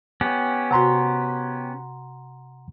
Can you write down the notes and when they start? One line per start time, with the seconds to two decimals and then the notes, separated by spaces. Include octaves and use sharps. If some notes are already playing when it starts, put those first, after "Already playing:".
0.21 B3 C#4 G4
0.71 C3 F#4 F#5 A#5 C6